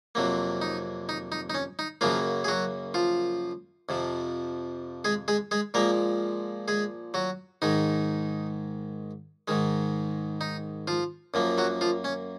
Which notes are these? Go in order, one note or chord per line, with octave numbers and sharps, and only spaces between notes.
F2 C3 F#3 A#3
D#4
D#4
D#4
D#4
C#4
D#4
F#2 C#3 F3 F#3 A#3 F4
G#4
F#3 F#4
F3 F4
F2 C3 F3
G#3 G#4
G#3 G#4
G#3 G#4
A#2 F3 G#3 A#3 A#4
G#3 G#4
F#3 F#4
G#2 D#3 G#3 D#4
G#2 D#3 G#3
D#4
F3 F4
F#2 F3 A#3
F#3 F#4
F3 F4
C#4